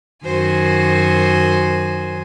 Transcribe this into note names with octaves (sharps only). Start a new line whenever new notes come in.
F#2 D#3 F#4 C5 G#5